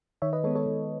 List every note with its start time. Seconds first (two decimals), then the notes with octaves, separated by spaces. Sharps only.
0.22 D#3 C#5 E5
0.33 B4 D#5
0.44 G#3 B3 A4 C#5
0.55 A4 C#5
0.66 D#3